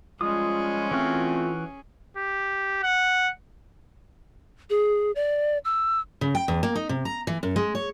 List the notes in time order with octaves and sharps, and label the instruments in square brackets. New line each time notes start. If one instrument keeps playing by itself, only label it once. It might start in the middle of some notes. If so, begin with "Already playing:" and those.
[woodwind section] F3 G3 G#3 [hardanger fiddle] C#4 G#4 [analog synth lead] F4 [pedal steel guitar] D#6
[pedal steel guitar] E3 F#4 F6 [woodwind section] A3 C4
[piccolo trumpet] G4
F#5
[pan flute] G#4
D5
E6
[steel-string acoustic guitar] C#3
G5
E2
A#3
D#4
C3
A#5
E3
F#2
G#3
C#5